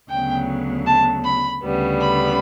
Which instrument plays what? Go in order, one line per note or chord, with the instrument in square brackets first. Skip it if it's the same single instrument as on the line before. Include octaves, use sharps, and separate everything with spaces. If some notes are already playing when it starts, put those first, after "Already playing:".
[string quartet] D2 C#3 F#3 B3 G5
A5
B5
D2 C#3 G3 B3
B5